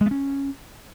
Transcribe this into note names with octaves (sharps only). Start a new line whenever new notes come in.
G#3
B3
C#4